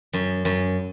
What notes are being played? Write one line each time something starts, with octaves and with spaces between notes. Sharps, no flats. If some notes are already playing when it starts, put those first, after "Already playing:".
F#2
F#2